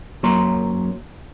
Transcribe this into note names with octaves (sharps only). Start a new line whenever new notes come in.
F#2 F#3 A#3 C#5 A#5 C6